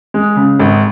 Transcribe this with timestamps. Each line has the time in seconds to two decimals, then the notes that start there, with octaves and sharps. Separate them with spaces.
0.14 G#3
0.36 C#3
0.60 G#1